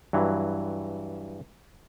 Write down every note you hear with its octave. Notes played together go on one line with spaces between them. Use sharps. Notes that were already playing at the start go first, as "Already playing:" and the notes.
G2 E3 F#3